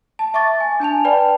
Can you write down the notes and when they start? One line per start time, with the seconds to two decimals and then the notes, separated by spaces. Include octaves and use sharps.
0.19 A5
0.34 E5 C#6 D6 A6
0.60 G#5
0.80 D4 G#5 A5 F7
1.05 B4 D5 G5 A5 B5